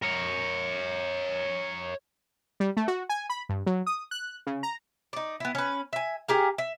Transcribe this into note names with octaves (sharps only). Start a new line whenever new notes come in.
A#4 C#5
G3
A3
F#4
G#5
B5
G2
F#3
D#6
F#6
C#3
A#5
D#4 D5
B3 E4
C#4 B4
E5 G#5
G4 G#4 A#4 F5
E5